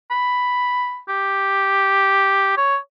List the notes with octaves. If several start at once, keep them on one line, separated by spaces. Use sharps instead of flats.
B5
G4
C#5